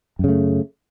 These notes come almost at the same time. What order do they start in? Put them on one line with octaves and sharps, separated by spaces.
F#2 C#3 A3